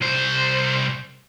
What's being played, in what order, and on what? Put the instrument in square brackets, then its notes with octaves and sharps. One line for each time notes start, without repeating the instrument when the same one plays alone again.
[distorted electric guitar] C2 C5